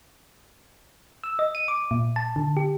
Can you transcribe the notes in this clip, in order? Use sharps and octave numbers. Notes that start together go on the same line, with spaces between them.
E6
D#5
D#7
D6
A#2
A5
D3
G4